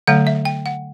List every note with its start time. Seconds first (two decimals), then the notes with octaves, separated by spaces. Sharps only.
0.07 D3 F#3 A3 F#5
0.27 E5
0.45 G5
0.66 F#5